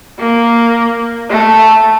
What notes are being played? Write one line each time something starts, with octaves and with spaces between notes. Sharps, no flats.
A#3
A3